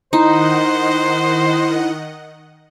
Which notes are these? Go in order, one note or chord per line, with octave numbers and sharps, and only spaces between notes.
D#3 D#4 E4 C5 D#5 F#5